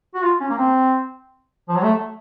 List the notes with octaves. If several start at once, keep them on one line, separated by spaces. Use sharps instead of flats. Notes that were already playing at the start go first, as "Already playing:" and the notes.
F#4
F4
C#4
A#3
C4
F3
F#3
A3